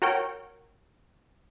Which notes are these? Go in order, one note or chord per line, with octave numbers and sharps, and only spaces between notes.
F#4 A#4 C#5 G5